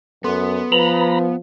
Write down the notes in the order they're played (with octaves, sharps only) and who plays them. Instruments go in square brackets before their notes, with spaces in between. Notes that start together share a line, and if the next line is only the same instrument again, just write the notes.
[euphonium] F#2 [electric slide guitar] B3 [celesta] A4 C6
[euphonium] F3 [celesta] B4 [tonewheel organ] A#5 B5